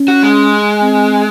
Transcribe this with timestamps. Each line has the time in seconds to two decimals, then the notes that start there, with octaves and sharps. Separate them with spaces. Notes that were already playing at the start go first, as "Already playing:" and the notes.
Already playing: C#4
0.08 F#4
0.23 G#3
0.82 C4